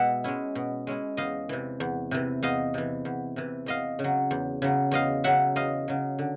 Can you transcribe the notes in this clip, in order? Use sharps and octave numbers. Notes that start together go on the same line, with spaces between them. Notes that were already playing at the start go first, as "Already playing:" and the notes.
Already playing: B2 G#3 E5 F#5
G#3 C#4 E4
B2
G#3 C#4 E4
E2 D#5 F5
C3 E3
E2
C3 E3
E2 D#5 F5
C3 E3
E2
C3 E3
E2 D#5 F5
C#3
F#3
E2
C#3 F#3
E2 D#5 F5
C#3 F#3 E5 F#5
E2 D#5 F5
C#3 F#3
D3